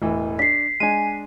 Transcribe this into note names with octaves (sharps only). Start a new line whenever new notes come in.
E1 A2 E3
D4 B6 C7
G#3 D4 G#5 D#7